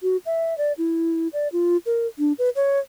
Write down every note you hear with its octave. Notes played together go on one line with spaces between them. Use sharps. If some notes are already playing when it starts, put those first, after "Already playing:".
F#4
E5
D5
E4
D5
F4
A#4
D4
B4
C#5